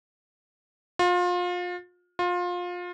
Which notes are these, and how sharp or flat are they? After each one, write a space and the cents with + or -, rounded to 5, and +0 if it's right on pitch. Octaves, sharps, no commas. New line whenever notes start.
F4 +30
F4 +25